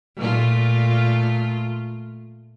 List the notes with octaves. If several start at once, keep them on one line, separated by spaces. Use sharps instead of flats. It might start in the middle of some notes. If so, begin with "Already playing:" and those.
A#2 A3 F4